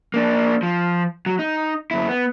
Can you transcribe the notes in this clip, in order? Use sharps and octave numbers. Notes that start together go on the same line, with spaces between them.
A#3 D4
F3
F#3
D#4
F#2 E4
B3